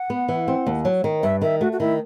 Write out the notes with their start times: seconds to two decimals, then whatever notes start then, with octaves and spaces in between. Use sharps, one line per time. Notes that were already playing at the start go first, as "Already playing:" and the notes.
Already playing: F#5
0.10 B3
0.28 E3
0.48 C4
0.67 D#2
0.85 F#3
1.04 D#3
1.23 G2 E5
1.42 D#3 E5
1.61 A3 F#4
1.72 F#4
1.80 D#3 E4